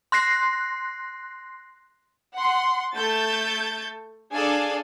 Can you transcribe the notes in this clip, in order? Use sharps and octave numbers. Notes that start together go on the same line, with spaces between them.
C6 F#6 A#6 C7
F#5 C6
A3 A4 G6 A6
D4 G#4 A4 D5 F5 G#5